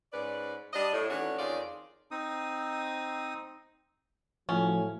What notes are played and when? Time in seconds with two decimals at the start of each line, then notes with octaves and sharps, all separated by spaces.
0.13 G#2 C#4 B4 D5
0.73 G3 D4 D5 D#5
0.93 A2
1.10 D#3 E3 A3 C#4 D4 F#4
1.38 F2 D#3 C#4 F4 G#4 D5
2.11 C4 D#4 D#6
4.49 A2 F3 F#3 C#4